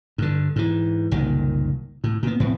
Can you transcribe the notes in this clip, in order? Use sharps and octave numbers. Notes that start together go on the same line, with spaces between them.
G2 D3
G#2 E3
F#1 C2 A#2 D#3
A2
A#2 B3
F1 A2 B3 C4